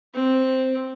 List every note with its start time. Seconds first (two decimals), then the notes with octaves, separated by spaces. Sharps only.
0.14 C4